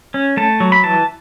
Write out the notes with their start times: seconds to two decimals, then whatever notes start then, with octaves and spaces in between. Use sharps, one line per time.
0.14 C#4
0.37 A3 A5
0.60 F#3
0.72 B5
0.83 E3 A5